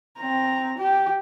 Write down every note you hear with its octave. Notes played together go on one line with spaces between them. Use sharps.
C4 A#5
G4